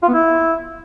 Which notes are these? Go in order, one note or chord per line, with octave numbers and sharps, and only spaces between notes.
F4
B3
E4